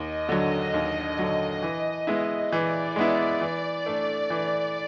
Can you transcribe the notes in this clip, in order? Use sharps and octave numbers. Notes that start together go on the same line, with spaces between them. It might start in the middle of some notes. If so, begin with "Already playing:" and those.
Already playing: D#2 D#5
D3 F#3
D#2
D3 F#3
E3
G#3 B3 E4
E3 D5
G#3 B3 E4
E3
A3 D4
E3